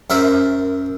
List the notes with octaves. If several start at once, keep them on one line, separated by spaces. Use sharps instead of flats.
F#2 A#4 C5 E5